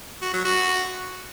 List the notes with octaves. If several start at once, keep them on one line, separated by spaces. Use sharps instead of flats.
F#4
F#3
F#4